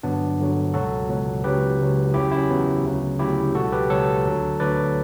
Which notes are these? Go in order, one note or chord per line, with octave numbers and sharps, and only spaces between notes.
G2 D3 F#3 B3 D4
G2 D3 F#3
C#2 B2 F#3 F#4 A4
C#2 B2 F#3
C#2 C#3 F#3 G4 B4
C#2 C#3 F#3
E2 C#3 F#3 E4 G4
C#4 E4
E2 C#3 F#3 B3
D2 C#3 F#3
D2 C#3 F#3 E4 G4
C#2 B2 F#3 F#4 A4
G4 B4
C#2 B2 F#3 A4 C#5
D2 D3 F#3
D2 D3 F#3 B4 D5